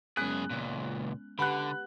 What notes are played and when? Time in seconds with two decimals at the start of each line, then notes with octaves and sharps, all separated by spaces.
0.17 F#2 G#3 B3 C#4 G#4 F#6
0.50 C#2 A#2
1.39 D3 G4 B4 F#5 B5 F#6